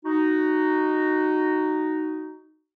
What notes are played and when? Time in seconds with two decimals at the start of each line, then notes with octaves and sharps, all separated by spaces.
0.05 D#4 F#4